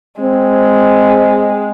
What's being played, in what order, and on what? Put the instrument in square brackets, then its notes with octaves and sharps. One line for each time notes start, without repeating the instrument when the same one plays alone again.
[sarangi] G#3 [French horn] C4